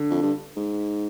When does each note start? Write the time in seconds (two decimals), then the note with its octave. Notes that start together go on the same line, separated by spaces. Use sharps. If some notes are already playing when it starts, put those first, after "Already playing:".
Already playing: D3
0.10 F2
0.22 G2
0.56 G#2